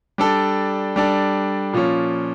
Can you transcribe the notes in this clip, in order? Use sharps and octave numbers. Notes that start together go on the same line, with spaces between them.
G3 D4 A4
G3 D4 A4
A#2 F3 C#4